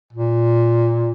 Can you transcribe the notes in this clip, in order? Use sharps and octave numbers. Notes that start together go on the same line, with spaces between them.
A#2